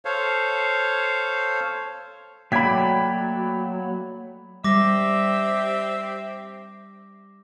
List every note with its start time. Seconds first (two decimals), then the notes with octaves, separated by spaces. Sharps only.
0.05 A4 C5 C#5 F5
2.52 F#3 A3 A#3 D5 G5 B5 G#6 B6
4.64 G3 C4 G4 E5 D6 A#6